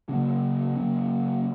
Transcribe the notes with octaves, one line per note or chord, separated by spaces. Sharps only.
C#3 F#3 A#3 C#4
C#3 F#3 A#3 C#4